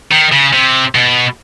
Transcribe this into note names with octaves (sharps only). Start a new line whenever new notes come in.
D#3
C#3
C3
B2